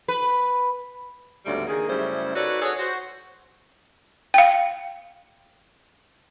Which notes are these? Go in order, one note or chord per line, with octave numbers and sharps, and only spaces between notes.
B4
D2 G#2 C#3 G3 A3 B3
D#3 A#3 D#4 G#4
F#2 C#3 G3 A3 E4 C5
D#4 F#4 A4 B4 C#5 D5
F#4 G#4 A4 C#5
F#4 C5
F5 G5